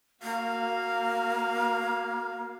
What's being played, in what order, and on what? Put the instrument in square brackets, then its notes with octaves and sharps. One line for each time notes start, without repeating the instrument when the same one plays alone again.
[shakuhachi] A#3 [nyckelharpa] F#4 F5